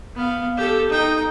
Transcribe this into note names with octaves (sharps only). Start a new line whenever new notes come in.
B3 F5
G4 A4
D#4 G5